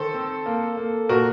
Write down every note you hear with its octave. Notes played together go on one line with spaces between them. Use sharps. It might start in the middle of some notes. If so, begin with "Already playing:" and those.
Already playing: D#3 A4 C5
C4
A#3
A#3
A#2 F#4 A#4